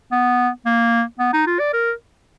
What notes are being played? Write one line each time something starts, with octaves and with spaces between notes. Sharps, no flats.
B3
A#3
B3
D#4
F4
D5
A#4